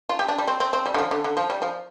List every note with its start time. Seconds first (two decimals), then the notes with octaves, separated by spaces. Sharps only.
0.09 F4
0.19 G4
0.28 D4
0.38 G3
0.47 C4
0.60 C4
0.73 C4
0.86 G3
0.94 D3
0.98 F3
1.11 D3
1.24 D3
1.37 F3
1.50 G3
1.62 F3